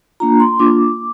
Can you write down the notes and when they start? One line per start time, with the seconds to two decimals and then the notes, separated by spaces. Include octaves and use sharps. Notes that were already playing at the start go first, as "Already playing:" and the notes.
0.20 A#3 D4 F4 A#5
0.40 C6
0.59 A#3 D4 F4 D6